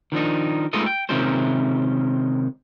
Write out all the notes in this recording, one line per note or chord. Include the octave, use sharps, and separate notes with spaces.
D#3 F3 D4 D#4
G#3 A3 B3 D#4 F4 D#5
G5
C3 D#3 G#3 C#4 F4 C5